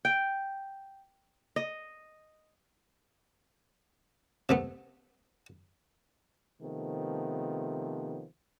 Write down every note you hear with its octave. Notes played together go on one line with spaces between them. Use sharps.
G5
D#5
C3 A3 B3
C3 D#3 F3 A3 B3